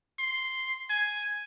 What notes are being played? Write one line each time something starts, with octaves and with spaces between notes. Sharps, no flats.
C6
G#5